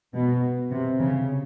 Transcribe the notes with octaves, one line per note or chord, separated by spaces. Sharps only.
B2
C3
C#3